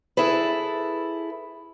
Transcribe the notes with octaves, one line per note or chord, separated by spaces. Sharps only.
E4 G#4 A4 B4